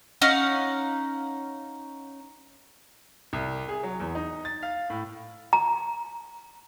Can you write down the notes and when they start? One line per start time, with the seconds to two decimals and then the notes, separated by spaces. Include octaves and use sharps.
0.22 C#4 D#4 F5 F#5
3.33 C2
3.69 G#4
3.83 F#3
4.00 E2
4.15 D#4
4.45 A6
4.63 F5
4.90 A2
5.53 A#5